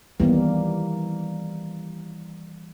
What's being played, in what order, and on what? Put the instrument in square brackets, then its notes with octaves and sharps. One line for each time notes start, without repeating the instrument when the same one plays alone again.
[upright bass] D#3 B3 [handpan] E3 G3 A#3